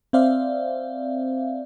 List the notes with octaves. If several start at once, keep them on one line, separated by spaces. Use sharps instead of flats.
C4 C5 D5 E5 F5